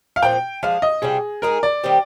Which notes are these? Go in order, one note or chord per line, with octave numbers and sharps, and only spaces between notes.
F5
A#2 F3 C4 G5
F3 G#3 D4 F5
D#5
C3 G3 D4 F4 G#4
G#3 D#4 G#4 A#4
D5
D#3 G3 C4 G4